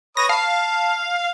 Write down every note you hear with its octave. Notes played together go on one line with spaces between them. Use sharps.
B4 C#5 D#6 A#6
F5 A5